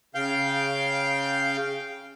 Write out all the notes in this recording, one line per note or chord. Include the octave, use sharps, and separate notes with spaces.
C#3 F5 G5 G6